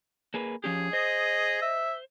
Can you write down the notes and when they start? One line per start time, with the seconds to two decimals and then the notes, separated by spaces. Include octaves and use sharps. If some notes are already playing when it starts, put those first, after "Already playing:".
0.34 A#3 G#4 B4
0.64 F3 C#4 G4 G#4
0.93 C5 D#5
1.62 E5